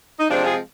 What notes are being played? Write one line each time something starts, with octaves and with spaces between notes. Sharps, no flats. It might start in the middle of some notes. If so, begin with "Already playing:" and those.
D#4
C3 F3 G#3 C4 D4
F4 G#4